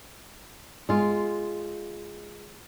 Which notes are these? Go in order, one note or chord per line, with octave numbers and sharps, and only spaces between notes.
G#3 F4